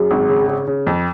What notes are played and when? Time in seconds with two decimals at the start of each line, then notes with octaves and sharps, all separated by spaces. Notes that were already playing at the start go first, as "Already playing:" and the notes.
Already playing: F#2 G#4
0.11 G#1
0.29 C#3
0.48 C#3
0.67 C#3
0.87 F2